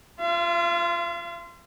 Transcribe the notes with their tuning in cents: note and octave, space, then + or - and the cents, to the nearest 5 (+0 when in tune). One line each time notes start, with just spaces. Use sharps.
F4 -15 F5 -45